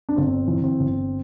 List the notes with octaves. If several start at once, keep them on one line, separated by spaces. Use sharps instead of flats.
D4
G1 C4
E3
C4
G1